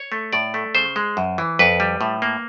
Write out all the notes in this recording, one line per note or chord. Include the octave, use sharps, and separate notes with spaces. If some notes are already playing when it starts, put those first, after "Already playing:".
Already playing: C#5
A3
A2 D5
A3
C#3 C5
G#3
F#2
E3
F2 B4
G3
A2
A#3